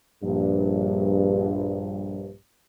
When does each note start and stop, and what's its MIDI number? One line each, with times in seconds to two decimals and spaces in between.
0.22 2.31 34
0.22 2.31 43